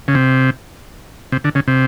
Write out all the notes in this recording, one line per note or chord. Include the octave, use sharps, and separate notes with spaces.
C#3
C3
C3
D3
C#3
C3